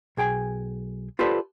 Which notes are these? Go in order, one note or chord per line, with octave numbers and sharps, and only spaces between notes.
B1 G#4 G5 G#5
F4 G4 A4 B4 C5 D5